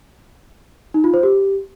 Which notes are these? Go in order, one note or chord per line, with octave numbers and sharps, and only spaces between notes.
D#4
F4
C5
G4